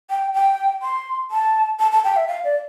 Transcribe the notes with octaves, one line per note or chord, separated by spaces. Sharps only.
G5
G5
C6
A5
A5
A5
G5
E5
F5
D5